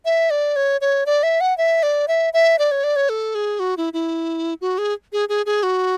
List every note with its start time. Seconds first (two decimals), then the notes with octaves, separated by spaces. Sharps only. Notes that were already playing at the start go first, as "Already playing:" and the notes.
0.05 E5
0.30 D5
0.56 C#5
0.81 C#5
1.06 D5
1.23 E5
1.41 F#5
1.58 E5
1.83 D5
2.08 E5
2.33 E5
2.59 D5
2.71 C#5
2.84 D5
2.96 C#5
3.09 A4
3.35 G#4
3.60 F#4
3.77 E4
3.93 E4
4.61 F#4
4.78 G#4
5.13 G#4
5.29 G#4
5.46 G#4
5.63 F#4